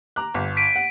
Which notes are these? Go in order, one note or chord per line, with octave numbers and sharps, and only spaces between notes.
A#5 D6 F#6
G1
B6 D7 D#7
F#5